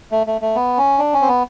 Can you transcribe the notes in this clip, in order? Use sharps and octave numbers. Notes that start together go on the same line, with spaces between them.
A3
A3
A3
B3
C#4
D4
C#4
C4
B3